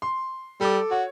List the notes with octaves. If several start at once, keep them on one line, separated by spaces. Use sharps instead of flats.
C6
G3 A4 D6
F#4 C#5